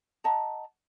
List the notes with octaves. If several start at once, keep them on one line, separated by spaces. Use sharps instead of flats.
D#5 F#5 A5 A#5